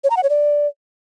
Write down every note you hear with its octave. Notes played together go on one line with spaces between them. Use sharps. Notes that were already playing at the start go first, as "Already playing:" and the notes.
C#5
A#5
F#5
C#5
D5